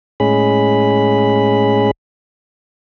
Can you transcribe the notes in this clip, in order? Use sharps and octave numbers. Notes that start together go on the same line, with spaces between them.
A2 G#3 C#4 G#4 B5